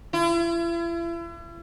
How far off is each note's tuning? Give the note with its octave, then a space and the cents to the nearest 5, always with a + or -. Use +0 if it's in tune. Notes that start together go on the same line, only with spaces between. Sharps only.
E4 +40